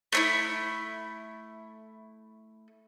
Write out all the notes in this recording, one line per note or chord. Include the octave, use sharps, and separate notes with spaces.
A3 D4 E4